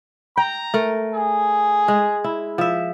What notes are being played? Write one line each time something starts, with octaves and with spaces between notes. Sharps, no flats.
G5 A#5
A3 A#4
G#4
G#3
E4
F3 E5